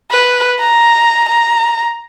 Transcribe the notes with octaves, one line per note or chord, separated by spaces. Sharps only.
B4
A#5
A#5